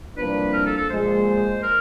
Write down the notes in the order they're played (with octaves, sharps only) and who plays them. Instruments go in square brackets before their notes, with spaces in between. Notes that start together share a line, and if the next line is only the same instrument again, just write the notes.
[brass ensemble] C2 C3 F3 A#3 D4 [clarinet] B4
[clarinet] A#4
A4
A4
[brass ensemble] A#1 A#2 F3 G#3 [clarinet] C5
[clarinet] A#4